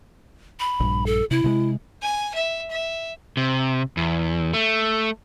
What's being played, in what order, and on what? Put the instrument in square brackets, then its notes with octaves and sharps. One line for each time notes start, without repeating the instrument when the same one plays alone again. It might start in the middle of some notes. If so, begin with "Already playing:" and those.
[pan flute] B5
[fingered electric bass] A#1 G2
[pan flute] A4
[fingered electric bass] C3 [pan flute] E4
[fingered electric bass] C3 F#3 G#3
[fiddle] G#5
E5
E5
[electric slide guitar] C3
E2
A3